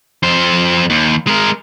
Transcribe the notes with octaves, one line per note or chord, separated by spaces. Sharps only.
F2 C5
D#2
G#3 A#4